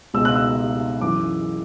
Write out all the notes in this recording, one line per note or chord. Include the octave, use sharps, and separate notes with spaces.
C#2 B2 E6
F#6
E6
F#2 E3 D6